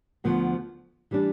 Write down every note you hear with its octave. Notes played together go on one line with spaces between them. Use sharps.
D2 D3 F3 B3
E3 G3 D4